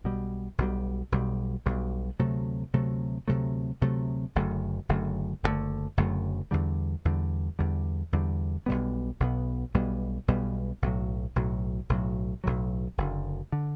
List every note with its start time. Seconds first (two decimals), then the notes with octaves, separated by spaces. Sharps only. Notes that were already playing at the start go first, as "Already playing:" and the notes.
0.04 B1 B2 G3
0.58 B1 B2 G3
1.12 B1 B2 G3
1.66 B1 B2 G3
2.19 D2 C3 F#3 A3
2.74 D2 C3 F#3 A3
3.28 D2 C3 F#3 A3
3.82 D2 C3 F#3 A3
4.35 F#1 F#2 D3 A3
4.89 F#1 F#2 D3 A3
5.43 F#1 F#2 D3 A3
5.97 F#1 F#2 D3 A3
6.51 E2 D3 G3
7.05 E2 D3 G3
7.59 E2 D3 G3
8.12 E2 D3 G3
8.66 B1 B2 G3 B3
9.20 B1 B2 G3 B3
9.74 B1 B2 G3 B3
10.28 B1 B2 G3 B3
10.82 B1 A2 F#3
11.36 B1 A2 F#3
11.89 B1 A2 F#3
12.44 B1 A2 F#3
12.98 F#1 F#2 D3
13.52 D3